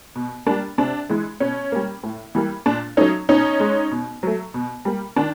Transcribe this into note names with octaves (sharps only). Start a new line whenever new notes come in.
B2
G3 A#3 D4
C3 D4
E3 G#3
B2 C#4
G3 A#3
A2
E3 G3 A#3
A#2 D4
F#3 A3 C#4 D#4
B2 C#4 D#4
G#3
B2
F#3 A3
B2
G3 A#3
D#3 D4